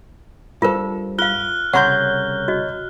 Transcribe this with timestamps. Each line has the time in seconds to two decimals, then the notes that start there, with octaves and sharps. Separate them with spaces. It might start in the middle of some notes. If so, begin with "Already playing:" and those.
0.62 G2 F4 A4 A#4 C5
1.18 F4 F5 F6 F#6 G7
1.73 C2 C#3 C#5 F#5 A#5 C6 G6
2.48 F#4 D#5